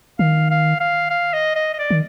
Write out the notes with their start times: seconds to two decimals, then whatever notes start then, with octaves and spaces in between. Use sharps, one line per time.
0.19 D#3 F5
0.50 F5
0.80 F5
1.10 F5
1.34 D#5
1.56 D#5
1.74 D#5
1.79 D5
1.90 D#3